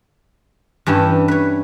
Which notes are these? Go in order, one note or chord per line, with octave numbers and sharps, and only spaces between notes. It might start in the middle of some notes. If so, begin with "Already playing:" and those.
G2 E3 C#4 G4
B4 C#5